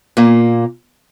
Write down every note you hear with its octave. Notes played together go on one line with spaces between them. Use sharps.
A#2 A#3